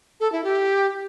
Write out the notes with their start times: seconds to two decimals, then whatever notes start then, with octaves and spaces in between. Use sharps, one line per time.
0.20 A4
0.32 E4
0.44 G4